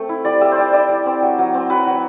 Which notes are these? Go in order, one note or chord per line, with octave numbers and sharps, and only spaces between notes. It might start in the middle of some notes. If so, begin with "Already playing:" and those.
Already playing: A3 C4
E4
G3 D5
G3 E5
C5
G3 D5
E4 D5
G3
C4
F#3
F#3
C4
F#3 B4
F#3